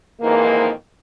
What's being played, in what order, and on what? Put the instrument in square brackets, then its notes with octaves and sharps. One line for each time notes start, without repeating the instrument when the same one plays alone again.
[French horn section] F2 G#2 D#3 E3 A#3